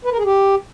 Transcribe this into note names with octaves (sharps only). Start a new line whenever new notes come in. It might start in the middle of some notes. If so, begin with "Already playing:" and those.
B4
A#4
G#4
G4